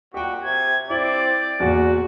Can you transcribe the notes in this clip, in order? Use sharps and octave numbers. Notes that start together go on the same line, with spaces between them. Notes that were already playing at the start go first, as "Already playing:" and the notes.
A#2 F#4 G4 G5
C3 G#6
C4 E4 D5 F#7
E2 A#2 F#4